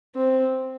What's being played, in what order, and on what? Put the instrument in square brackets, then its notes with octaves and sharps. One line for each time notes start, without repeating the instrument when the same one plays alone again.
[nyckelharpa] C4